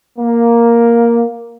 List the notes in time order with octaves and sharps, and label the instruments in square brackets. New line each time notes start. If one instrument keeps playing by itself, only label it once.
[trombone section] A#3